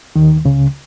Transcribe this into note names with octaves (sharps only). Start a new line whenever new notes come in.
D#2 D#3
C#2 C#3